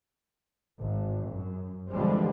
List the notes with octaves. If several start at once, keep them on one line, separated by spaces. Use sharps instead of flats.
G#1
F#2
D3 E3 F3 G3 G#3 C4